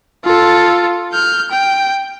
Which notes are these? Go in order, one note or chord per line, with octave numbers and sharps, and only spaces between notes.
F4 A4
F6 G6
G5